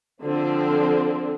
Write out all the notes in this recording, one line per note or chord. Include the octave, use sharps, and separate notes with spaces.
D3 F3 C4